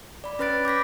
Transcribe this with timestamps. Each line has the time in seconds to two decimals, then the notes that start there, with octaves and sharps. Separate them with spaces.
0.24 D5 B5
0.39 C#4 B4 B5 F#6 A6 D7
0.65 D6 G6 A#6 B6